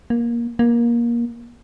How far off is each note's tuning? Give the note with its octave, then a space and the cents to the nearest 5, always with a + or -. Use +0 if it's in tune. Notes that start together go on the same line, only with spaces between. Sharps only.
A#3 +15
A#3 +20